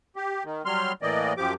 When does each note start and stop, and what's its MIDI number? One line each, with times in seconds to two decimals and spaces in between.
0.16 0.43 67
0.45 0.62 51
0.66 0.92 54
0.66 0.92 55
0.66 0.92 84
0.66 0.92 89
1.02 1.33 45
1.02 1.33 52
1.02 1.33 58
1.02 1.33 74
1.02 1.33 75
1.37 1.54 42
1.37 1.54 53
1.37 1.54 67
1.37 1.54 86